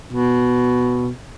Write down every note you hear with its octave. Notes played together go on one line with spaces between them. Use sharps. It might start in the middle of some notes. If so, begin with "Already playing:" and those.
B2